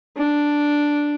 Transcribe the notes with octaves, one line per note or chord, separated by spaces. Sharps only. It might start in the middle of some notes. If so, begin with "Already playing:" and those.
D4